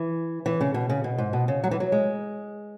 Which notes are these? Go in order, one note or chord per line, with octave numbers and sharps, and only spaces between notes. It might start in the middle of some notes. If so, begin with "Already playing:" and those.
Already playing: E3
E3
C#3
B2
C#3
B2
G#2
B2
C#3
F#3
E3
F#3
G#3